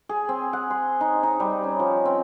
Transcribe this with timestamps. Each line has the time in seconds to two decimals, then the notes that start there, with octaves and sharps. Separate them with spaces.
0.09 G#4
0.29 C4
0.53 F#5
0.70 C6
1.01 D#4
1.23 D#4
1.40 G3
1.64 C#4
1.79 F3
2.05 C4